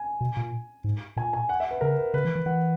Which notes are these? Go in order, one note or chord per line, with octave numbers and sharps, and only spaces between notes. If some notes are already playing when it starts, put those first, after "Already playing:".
Already playing: G#5
B2
A#2
G#2
A#2 G#5
G#5
F#5
E5
B4
C#3 A#4
B4
C#3 B4
E3
E3
E3 F#5